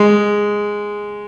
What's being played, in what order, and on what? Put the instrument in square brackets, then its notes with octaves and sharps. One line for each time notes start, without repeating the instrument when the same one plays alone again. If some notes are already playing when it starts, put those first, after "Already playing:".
Already playing: [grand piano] G#3